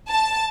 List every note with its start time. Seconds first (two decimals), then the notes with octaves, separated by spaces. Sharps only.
0.10 A5